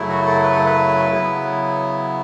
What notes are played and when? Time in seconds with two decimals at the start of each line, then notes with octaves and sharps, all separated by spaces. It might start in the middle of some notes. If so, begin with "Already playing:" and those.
Already playing: F#2 C#3 F#3 A3 E4
0.09 F#4
0.26 A4
0.43 B4
0.55 A4
0.66 B4
1.11 C#3 F#3 B3 E4